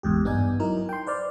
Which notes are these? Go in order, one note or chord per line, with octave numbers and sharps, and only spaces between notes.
A1 E2 G#2 G4
G2 B3 D#4 D5 G#5
F#3 D#4 E4 A#4
G5 C6
B4 C5 D5 F6